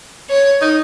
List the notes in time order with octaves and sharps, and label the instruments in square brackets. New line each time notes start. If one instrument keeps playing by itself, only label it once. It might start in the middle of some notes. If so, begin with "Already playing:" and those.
[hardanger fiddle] C#5
[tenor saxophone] D#4